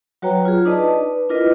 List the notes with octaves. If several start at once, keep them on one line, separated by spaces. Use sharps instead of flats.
F#3 F#4 B4 C#5 G5 A#5
F4 G#4
D4 D#4 B4 D5 D#5 A5
B4
D4 E4 F4 A#4 B4 D#5